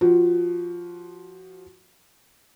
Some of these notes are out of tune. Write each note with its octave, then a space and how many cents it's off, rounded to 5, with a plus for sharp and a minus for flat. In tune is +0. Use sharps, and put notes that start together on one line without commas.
F3 +0 F#4 +20